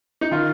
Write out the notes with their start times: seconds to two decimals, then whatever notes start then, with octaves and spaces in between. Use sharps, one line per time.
0.21 D#4
0.31 D#3 F4